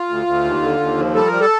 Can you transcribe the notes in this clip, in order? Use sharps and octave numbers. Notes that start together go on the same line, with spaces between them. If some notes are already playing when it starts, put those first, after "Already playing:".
Already playing: F4
D2
D2
D#2
D3
D#2
F3
G3 A4
G3 A#4
A4